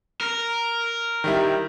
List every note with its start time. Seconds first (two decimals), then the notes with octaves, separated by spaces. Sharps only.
0.21 A#4
1.24 D#3 G3 E4